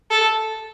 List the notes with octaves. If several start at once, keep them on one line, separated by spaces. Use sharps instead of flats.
A4